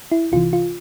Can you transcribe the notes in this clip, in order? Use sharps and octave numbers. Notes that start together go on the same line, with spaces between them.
E4
C2 C3 E3 F4
F4